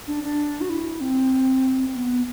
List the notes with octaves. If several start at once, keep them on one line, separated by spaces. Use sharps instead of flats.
D4
D4
F#4
E4
C4
B3